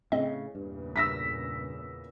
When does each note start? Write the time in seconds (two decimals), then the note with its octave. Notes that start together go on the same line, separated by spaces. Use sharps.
0.12 A2 C#3 C4 D#5
0.55 E2 G2 A#2 C#3
0.96 G2 E6 A#6 B6